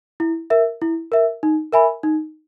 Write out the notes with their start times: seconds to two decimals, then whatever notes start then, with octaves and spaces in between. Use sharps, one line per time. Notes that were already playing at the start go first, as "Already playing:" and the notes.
0.20 E4
0.50 A#4 E5
0.82 E4
1.12 A#4 E5
1.43 D#4
1.73 A#4 E5 G#5 B5
2.03 D#4